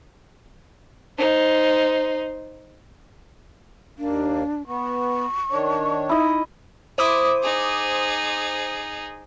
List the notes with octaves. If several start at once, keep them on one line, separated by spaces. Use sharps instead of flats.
D#4 C5
D#2 A#3 D4
B3 C#6
D#3 D4 C#5
D#4 E4 D#5
E4 C5 D6 D#6
D#4 G#4